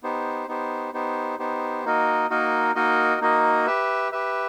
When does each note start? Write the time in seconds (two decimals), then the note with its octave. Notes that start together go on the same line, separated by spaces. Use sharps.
0.03 B3 D#4 G4 C5
0.48 B3 D#4 G4 C5
0.93 B3 D#4 G4 C5
1.39 B3 D#4 G4 C5
1.85 A#3 D#4 F#4 A#4 D#5
2.30 A#3 D#4 F#4 A#4 D#5
2.75 A#3 D#4 F#4 A#4 D#5
3.21 A#3 D#4 F#4 A#4 D#5
3.67 G4 B4 E5
4.12 G4 B4 E5